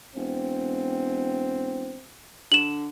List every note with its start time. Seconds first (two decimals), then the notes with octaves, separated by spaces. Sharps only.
0.16 E1 C4
2.52 D3 E7 F#7